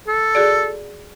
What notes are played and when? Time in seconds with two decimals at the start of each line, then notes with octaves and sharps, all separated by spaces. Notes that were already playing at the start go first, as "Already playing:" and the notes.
0.08 A4
0.35 F#4 G#4 D5